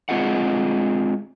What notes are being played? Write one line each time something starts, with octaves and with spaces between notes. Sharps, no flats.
G#3 C4 F4 G#4 D#5 F#5